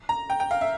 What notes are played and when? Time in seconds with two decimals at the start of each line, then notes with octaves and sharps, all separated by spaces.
0.09 A#5
0.30 G5
0.40 G5
0.51 F5
0.61 E5